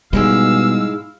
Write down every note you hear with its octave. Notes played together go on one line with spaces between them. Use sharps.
G#2 B2 G3 G#3 E4 F5 E6